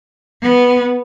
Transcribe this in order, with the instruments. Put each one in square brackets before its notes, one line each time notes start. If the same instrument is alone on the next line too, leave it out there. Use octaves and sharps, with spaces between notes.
[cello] B3